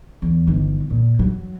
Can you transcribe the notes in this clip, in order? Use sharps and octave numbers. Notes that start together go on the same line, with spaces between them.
E2
G1 D#3
A#2
F#3